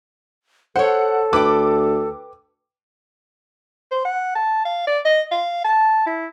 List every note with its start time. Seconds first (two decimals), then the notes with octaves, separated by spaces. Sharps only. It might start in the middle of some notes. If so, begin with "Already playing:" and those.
0.76 A4 C5 C#5 F#5
1.33 D2 B4 G5 D6
3.92 C5
4.05 F#5
4.35 A5
4.66 F5
4.87 D5
5.05 D#5
5.32 F5
5.64 A5
6.06 E4